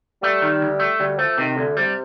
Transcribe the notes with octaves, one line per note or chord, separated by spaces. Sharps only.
G3 A3
D#3
D2
A3
D2 G3
F3 A3
C3 D#3
D2 D3
C3 G3